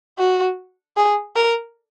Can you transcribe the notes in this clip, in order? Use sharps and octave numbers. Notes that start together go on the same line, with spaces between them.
F#4
G#4
A#4